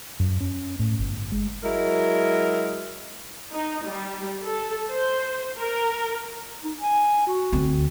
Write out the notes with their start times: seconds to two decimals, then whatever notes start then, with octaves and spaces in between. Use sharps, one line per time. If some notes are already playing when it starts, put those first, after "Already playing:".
0.19 F#2
0.40 C#4
0.79 A2
0.98 G1
1.32 G#3
1.64 F#3 G#3 E4 A#4
3.51 D#4
3.85 G3
4.42 A4
4.90 C5
5.58 A#4
6.64 D#4
6.80 G#5
7.27 F#4
7.53 D2 C4